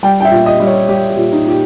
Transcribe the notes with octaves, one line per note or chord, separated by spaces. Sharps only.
G3 G5
G5
E5
A#2
D#5
G3
C#5
G3 G4
G4
A#2
D#4
A#2 G4